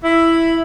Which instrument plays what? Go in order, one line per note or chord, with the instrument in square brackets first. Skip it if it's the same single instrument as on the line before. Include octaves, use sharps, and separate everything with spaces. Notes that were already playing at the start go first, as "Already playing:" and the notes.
[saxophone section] E4